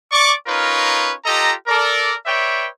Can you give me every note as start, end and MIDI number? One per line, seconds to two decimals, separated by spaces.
0.12 0.34 74
0.12 0.34 85
0.12 0.34 86
0.47 1.13 61
0.47 1.13 63
0.47 1.13 65
0.47 1.13 70
0.47 1.13 71
0.47 1.13 73
1.25 1.54 65
1.25 1.54 67
1.25 1.54 69
1.25 1.54 75
1.25 1.54 82
1.67 2.14 69
1.67 2.14 70
1.67 2.14 74
2.25 2.68 71
2.25 2.68 73
2.25 2.68 74
2.25 2.68 76
2.25 2.68 79